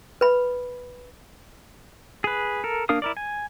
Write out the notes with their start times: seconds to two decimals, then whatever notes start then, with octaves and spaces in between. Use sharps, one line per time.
0.21 B4 B5
2.24 G#4 B4
2.64 A4 A#4
2.89 A#3 D4 A#4 F5 D#6
3.02 E4 A#4 D5
3.17 G#5